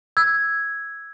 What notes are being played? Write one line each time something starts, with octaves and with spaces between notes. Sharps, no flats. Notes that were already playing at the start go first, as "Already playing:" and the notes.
E6 G#6